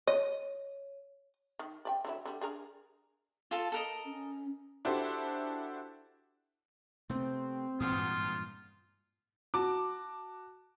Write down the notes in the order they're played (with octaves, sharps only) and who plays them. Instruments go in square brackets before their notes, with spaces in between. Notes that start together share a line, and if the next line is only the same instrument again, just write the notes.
[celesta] C#5 [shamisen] D#5
[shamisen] D#3
D5 E5 G5
D3 F#3 E4
D3 G3
D4 G#4 A#4
[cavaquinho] F4 A4 A5
A4 A#4 D#5
[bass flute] C#4
[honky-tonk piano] D4 E4 F#4 G4 A4 C5
[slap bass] C3 A3 B3 [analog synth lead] C4
[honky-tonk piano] G#1 E2 D#6 [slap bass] G2 A#2 E3 [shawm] F4
[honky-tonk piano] F#4 A5 D6